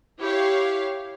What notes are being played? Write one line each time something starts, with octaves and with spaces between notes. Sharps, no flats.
E4 G4 C#5 F5